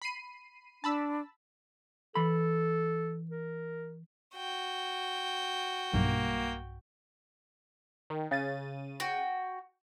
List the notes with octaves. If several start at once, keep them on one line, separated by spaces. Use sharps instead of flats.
B5 C7 D#7
D4 A5 B5 E6
E3 A4 B5
A#4
F#4 G5
B1 G2 A#3
D#3
C#3 A6 D#7
F#4 G5